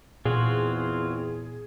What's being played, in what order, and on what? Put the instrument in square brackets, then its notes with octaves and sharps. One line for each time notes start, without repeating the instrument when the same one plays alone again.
[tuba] E2 [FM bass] A#2 [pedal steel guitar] C4 F4 F#4 [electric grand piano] G#4